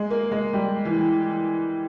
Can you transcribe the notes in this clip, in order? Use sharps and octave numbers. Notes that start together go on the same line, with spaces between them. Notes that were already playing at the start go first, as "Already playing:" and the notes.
Already playing: G#3
A#3
G#3
G3
E3